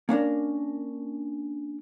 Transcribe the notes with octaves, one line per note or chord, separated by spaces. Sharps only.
A#3 C#4 D4 A#4